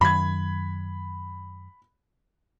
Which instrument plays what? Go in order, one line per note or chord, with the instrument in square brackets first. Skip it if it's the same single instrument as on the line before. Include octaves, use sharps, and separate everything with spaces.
[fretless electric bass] F#2 D#3 [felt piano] B5 G#6